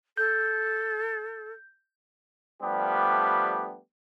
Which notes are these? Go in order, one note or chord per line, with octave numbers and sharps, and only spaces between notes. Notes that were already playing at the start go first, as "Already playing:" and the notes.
A4 G6
F3 G3 A3 B3 D4 G4